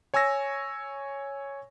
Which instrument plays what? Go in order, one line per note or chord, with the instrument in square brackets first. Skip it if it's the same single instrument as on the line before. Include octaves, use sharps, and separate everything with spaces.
[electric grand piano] C#5 G#5 C#6 E6 A#6